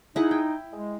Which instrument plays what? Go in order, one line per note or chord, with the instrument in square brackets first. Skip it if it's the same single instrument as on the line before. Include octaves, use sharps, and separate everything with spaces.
[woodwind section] D#4 [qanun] E4 G#4 F#5
[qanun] G5
[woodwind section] G#3